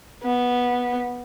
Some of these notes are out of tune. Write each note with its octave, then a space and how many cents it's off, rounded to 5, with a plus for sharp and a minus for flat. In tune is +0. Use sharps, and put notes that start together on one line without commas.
B3 -10